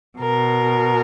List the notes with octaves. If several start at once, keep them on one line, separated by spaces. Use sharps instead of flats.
B2 A#4